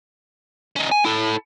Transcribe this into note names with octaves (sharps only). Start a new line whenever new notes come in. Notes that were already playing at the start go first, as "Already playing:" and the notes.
C#4 D#4
G#5
E4 A4